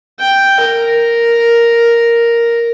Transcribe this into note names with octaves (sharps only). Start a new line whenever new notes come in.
G5
A#4